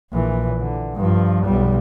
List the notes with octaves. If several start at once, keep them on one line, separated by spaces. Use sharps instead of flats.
A#1 E3
D3
G2 F3
B1 G3